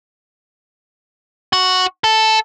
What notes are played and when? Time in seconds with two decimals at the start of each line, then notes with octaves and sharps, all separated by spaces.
1.53 F#4
2.04 A4